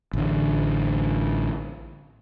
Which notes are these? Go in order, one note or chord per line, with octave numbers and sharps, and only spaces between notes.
A1 D3